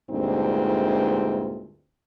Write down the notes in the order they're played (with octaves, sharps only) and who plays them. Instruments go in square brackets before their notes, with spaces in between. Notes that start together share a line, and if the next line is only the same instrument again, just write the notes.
[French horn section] D2 G2 A#2 G#3 C4 D#4